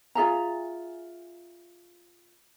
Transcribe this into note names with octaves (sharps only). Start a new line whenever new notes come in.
F4 G#4 E5 A#5